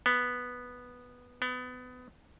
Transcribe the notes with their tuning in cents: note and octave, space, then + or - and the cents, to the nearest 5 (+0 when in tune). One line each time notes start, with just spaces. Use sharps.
B3 -5
B3 +25